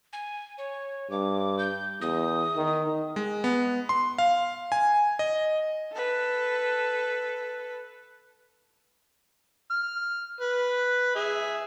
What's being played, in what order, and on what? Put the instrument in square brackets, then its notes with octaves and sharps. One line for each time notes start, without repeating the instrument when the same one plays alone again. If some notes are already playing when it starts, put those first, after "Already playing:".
[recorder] G#5
C#5
[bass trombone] G2 [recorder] D6
[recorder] G6
[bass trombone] E2 [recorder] D#6
[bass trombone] D#3
[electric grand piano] G#3
B3
C6
F5
G#5
D#5
[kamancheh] A4 B4
[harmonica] F6
B4
G#4 E5